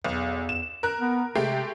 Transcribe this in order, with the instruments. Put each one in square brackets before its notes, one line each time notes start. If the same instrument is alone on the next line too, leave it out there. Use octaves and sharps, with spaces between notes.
[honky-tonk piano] B1 [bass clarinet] E2
[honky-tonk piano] E7
A#4 F#6
[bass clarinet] B3
[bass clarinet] C3 [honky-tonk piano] G#3 A3 G4